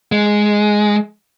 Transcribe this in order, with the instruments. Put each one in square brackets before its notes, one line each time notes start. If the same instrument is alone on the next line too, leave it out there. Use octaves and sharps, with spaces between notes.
[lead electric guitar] G#3